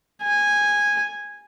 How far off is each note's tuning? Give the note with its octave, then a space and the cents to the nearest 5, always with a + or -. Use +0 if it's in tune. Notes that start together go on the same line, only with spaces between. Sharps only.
G#5 -10